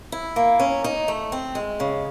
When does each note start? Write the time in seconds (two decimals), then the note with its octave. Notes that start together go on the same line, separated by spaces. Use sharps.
0.12 E4
0.36 A#3
0.60 C#4
0.84 D#4
1.08 A3
1.32 C4
1.55 G#3
1.80 C#3